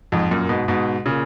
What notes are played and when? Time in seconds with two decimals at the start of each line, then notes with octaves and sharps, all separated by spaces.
0.12 F2 G#2
0.31 F#2 A#2
0.49 G#2 B2
0.68 G#2 B2
1.06 A#2 C#3